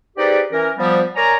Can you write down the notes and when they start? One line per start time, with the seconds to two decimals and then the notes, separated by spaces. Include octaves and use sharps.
0.17 C4 D#4 G4 G#4 B4 D5
0.52 E3 C#4 A#4
0.78 F3 G3 B3
1.16 A#4 C#5 D5 G#5 A#5